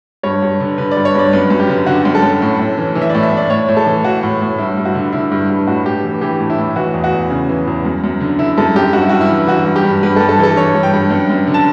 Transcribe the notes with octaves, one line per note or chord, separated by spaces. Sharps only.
G2 C#5
G2
D3
D3 B4
D5
G2
C#5
G2 D5
F#2 B4
F#2
G4
D3
D3 F#4
F#2
A4
F#2
A2
A2
E3
E3
E5
A2 D5
E5
A2 D5
A2 C#5
A2
A4
E3
E3 F#4
A2
A2
G2 E4
G2
F#4
D3
D3 E4
G2
G2
A2 F#4
A2 G4
E3
E3 G4
A2
E4
A2
E3 F#4
E2
F#4
E2
C#3
E3
E2
F#2
F#2
D3
D3 E4
F#2 A4
F#2 G4
G2 F#4
E4
G2 F#4
E4
E3
E3 F#4
G2
G4
G2
G2 B4
A4
G2
A4
E3 A4
E3 C#5
G2
G5
G2
F#2
F#2
D3
A5